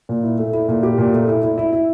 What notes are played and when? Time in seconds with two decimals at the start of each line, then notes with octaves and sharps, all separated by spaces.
0.09 A#2
0.23 E4
0.39 A3
0.53 E4
0.68 A#2
0.83 G4
0.98 A#2
1.13 A3
1.28 E4
1.42 E4
1.58 E4
1.72 E4